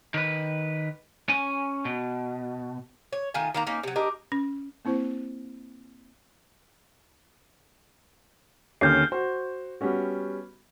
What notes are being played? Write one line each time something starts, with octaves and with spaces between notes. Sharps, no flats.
D#3 B4
C#4 G#5
B2
C#5
D#3 A3 F4 G#5
D#3 A#3 A#5
A#3 C#4 D#4
C3 F#3
D4 G4 A#4 D#5
C#4
A#3 C4 E4 C5
D#2 D3 C#4 F6 G6 C7
F#4 C5
G3 B3 C#4 F#4